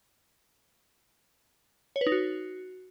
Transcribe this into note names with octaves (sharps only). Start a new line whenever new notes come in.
C#5
B4
D#4
F#4